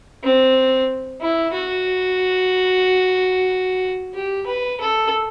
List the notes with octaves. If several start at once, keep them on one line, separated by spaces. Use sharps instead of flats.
C4
E4
F#4
G4
B4
A4